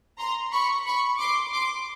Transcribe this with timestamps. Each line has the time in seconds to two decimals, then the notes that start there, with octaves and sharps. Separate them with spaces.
0.19 A#5 C6
0.52 B5 C#6
0.86 B5 C#6
1.20 C6 D6
1.53 C6 D6